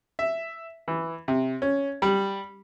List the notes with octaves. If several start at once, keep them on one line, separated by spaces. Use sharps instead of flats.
E5
E3
C3
C#4
G3